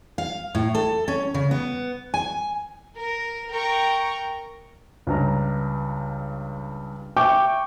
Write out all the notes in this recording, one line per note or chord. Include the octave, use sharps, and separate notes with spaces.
F5
A2
A4
C#4
C#3
B3
G#5
A#4
A#4 G5 A#5 C#6
C#2 G2 A#5
E5 G5 C#6 D6 G6